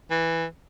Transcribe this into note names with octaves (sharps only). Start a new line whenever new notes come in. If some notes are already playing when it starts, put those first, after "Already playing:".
E3